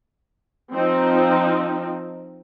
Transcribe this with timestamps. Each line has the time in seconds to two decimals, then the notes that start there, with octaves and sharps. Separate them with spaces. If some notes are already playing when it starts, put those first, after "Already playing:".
0.75 F3 C4 D#4